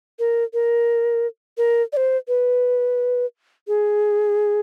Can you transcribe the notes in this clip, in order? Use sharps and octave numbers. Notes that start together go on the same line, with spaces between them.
A#4
A#4
A#4
D5
C5
B4
G#4